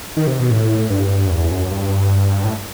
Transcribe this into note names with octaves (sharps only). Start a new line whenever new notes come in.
D#3
C3
B2
A2
G2
F#2
E2
F#2
G2
A2